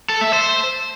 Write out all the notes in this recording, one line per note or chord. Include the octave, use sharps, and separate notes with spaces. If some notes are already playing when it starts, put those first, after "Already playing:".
A4
E5
C5